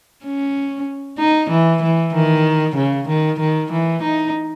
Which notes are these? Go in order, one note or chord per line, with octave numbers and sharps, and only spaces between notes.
C#4
D#4
E3
E3
D#3
C#3
D#3
D#3
E3
D#4